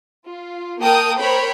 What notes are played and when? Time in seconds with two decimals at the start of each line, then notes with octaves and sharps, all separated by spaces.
0.24 F4
0.80 A#3 A#4 G5 A5 D#6
1.18 A#4 C5 C#5 G5 B5